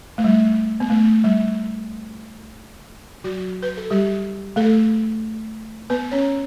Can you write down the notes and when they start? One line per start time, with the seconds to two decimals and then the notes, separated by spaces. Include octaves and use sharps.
0.18 A3
0.24 G3
0.80 B3
0.90 A3
1.24 G3
3.24 F#3 F#4
3.63 B4
3.77 A4
3.90 G3 G4
4.56 A3 A4
5.90 B3 B4
6.11 C#4 C#5